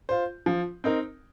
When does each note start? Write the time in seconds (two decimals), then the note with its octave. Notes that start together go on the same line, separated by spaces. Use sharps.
0.09 F4 C5
0.46 F3
0.84 C4 D#4 A#4